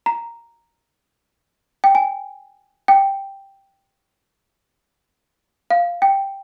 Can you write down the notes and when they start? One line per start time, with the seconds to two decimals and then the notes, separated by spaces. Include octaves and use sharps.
0.06 A#5
1.84 G5
1.95 G#5
2.88 G5
5.71 F5
6.02 G5